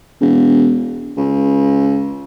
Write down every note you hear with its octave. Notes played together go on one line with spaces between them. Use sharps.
E1
C#2